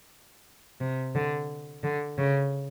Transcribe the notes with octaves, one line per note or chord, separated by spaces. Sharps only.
C3
D3
D3
C#3